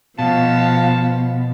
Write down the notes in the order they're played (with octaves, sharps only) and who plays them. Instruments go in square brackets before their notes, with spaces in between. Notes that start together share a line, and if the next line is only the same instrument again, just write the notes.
[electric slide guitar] B2 [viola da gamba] F3 B3 [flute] F5 [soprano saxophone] A5